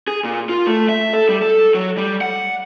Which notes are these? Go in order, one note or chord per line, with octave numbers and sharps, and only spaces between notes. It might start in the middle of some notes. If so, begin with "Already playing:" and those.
G#4
A#2
F4
A3
E5
A4
G3
A4
F#3
G3
F#5